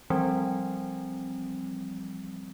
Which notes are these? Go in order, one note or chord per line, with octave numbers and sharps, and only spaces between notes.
E3 F3 G3 C4